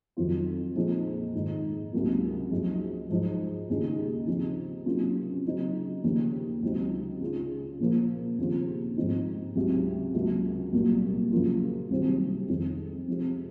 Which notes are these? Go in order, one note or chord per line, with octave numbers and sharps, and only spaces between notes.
F2 D#3 F#3 C4 F4
A#2 F3 G#3 C4 D#4
G#2 D#3 G#3 D#4
C#2 C3 F#3 A#3
F#2 F3 G#3 D#4
G#2 F3 G#3 D#4
D#2 C#3 G#3 D#4
C#3 F3 C4 D#4
C3 F#3 A#3 C#4 F4
C#3 F#3 C4 D#4
D#2 C#3 F3 A#3
C#2 C3 F#3 C4 D#4
C#3 G#3 C#4 F4
A#2 F3 A#3
D#2 C#3 F3 C4 F4
G#2 F3 C4 D#4
C#2 C3 F#3
C#2 C3 F#3 A#3
C2 A#2 F#3 A#3
F#2 C#3 F3 A#3 F4
C2 C3 D#3 F#3 C4
F2 D#3 G#3 C4
C3 F3 G#3 C4